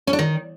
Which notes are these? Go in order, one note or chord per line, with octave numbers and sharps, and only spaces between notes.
C#4
D4
D#3